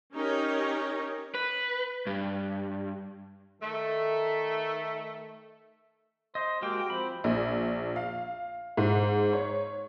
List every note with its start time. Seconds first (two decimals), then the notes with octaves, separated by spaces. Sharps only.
0.14 C#4 D#4 G4 A#4 C#5
1.35 B4
2.07 G2
3.61 D#3 A3
6.35 C5 D#5
6.62 G#3 A#3 F#4 G4 G5
6.90 F3 C4 B5
7.24 A#1
7.96 F5
8.77 G#2
9.33 C#5